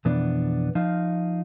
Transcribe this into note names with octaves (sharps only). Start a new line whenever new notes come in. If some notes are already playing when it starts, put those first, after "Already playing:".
F2 B2 E3 B3 D4 D5
F3 D#4 F4